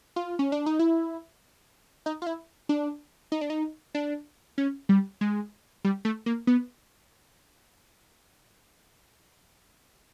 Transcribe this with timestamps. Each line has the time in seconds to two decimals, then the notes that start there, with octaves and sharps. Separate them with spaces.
0.16 F4
0.39 C#4
0.52 D4
0.66 D#4
0.79 E4
2.06 D#4
2.22 F4
2.27 E4
2.69 D4
3.32 D#4
3.41 D4
3.50 D#4
3.95 D4
4.58 C#4
4.89 G3
5.21 G#3
5.85 G3
6.05 A3
6.26 A#3
6.47 B3